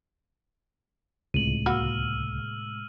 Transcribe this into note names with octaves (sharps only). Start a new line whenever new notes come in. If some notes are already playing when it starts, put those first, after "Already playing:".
C#2 A2 C3 G#3 D#7 F#7
A#3 F#4 B5 E6 F6